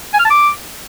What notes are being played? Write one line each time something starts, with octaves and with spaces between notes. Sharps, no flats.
G#5
F6
A5
D6